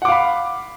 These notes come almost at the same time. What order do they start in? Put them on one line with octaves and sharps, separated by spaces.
F#5 D6 F5 B5